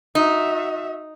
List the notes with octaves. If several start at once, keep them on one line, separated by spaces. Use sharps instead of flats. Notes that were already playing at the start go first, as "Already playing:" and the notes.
D#4 F#4 E5